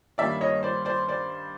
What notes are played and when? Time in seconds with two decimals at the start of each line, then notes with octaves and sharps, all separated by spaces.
0.18 G2 D#3 G3 A#3 C#4 D5 E5
0.41 C#5 D#5
0.63 C5 D5
0.85 C5 D5
1.08 C5 D5